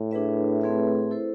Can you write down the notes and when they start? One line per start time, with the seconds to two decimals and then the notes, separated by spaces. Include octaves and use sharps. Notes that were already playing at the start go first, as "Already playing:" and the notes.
Already playing: A2
0.11 D4 G#4 B4 E5
0.61 A3 C4 G#4 B4 E5
1.11 E4 A4 C5